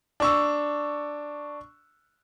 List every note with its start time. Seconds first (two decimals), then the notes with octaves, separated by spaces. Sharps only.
0.20 D4 C#6 E6